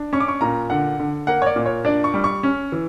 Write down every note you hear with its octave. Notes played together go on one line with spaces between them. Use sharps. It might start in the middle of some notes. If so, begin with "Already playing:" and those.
Already playing: D4
C#4 C#6
D6
C#6
A#2 A#5
D3 F#5
D3
A#3 F#5
C#5
D5
A#2
C#5
D4 D5
C#6
G3
C#6
C#4
E3